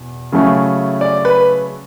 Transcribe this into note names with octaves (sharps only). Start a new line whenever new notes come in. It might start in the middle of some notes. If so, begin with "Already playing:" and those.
Already playing: E2 B2
C#3 F#3 A3 C#4 E4
D5
B4